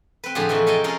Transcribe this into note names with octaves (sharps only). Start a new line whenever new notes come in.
C4 B4
A2 D3 F3 A3 G4 G#4
C3 E3 F3 D#4 F#4
A4 D#5 F5 G5 G#5 A#5
C#4 D#4 F4 G#4 A#4